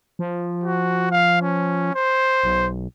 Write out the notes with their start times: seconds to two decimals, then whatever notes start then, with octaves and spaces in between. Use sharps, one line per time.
0.19 F3
0.64 F#4
1.11 F5
1.42 C#4
1.95 C5
2.43 B1